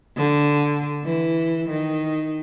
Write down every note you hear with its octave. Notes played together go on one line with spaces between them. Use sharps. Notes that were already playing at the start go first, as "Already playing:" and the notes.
D3
E3
D#3